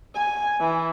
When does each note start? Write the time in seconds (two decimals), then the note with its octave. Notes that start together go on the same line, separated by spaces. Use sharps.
0.14 G#5
0.60 E3